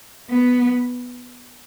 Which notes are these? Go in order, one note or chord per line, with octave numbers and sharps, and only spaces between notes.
B3